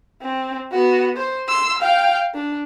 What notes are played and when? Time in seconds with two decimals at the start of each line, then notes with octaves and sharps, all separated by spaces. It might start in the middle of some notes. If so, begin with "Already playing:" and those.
0.22 C4
0.72 B3 F#4
1.17 C5
1.48 C6 E6
1.78 F5 G5
2.34 D4